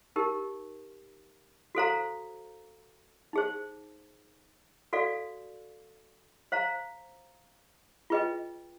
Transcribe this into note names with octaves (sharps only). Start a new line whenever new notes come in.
D#4 G4 A#4
F#4 A4 C5 F5 A#5
D#4 G#4 C5
F#4 A4 D5 F5
C5 F5 A#5
F4 G#4 B4 D#5 G5